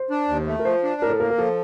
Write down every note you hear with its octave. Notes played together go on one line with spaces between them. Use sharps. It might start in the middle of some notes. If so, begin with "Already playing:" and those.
Already playing: C5
D4
D#2
A3
A#4
F3 C5
D4
A2 A#4
A4
A#3 A#4
A#4
F3 A4